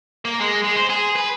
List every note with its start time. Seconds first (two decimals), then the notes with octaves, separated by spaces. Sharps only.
0.25 A#3
0.40 G#3
0.64 G#3
0.76 C5
0.90 G#4
1.16 B4